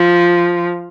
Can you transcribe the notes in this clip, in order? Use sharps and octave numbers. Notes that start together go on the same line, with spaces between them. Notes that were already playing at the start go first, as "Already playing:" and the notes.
Already playing: F3